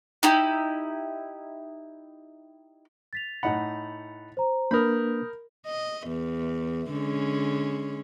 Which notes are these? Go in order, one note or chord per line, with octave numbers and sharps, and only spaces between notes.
D#4 E4 G4
A6 B6 F7
A2 D#4 F#5 B5
C5 A#5
A#3 D4 A#4 B4 B5 D#6 G6
D#5
E2
D3 G#3 C#4